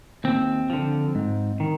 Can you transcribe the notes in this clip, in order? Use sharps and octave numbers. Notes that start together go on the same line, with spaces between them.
D#2 C4
D3 F3
G#2
D#3